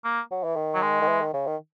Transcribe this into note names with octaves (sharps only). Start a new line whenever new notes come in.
A#3
F#3
E3
D#3
F#3
G#3
D#3
E3
D#3
C#3
D#3